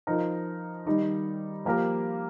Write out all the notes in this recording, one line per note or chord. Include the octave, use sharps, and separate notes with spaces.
F3 D#4 A#4
D#3 G3 D#4
F3 A#3 G4 A#4